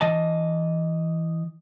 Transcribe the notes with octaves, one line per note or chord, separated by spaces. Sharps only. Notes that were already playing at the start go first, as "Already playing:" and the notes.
E3 D#5 A5